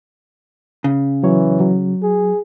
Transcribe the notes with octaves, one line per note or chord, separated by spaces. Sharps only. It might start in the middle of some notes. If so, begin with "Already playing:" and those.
C#3
E3 F#3 C#5
F#3
G#4